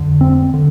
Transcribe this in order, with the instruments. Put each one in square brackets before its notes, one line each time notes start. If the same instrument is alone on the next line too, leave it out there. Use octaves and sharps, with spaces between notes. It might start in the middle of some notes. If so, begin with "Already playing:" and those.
Already playing: [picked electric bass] F2 D3
C4
D3